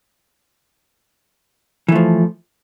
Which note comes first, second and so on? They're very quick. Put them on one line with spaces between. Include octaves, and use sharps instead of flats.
E3 A3 F3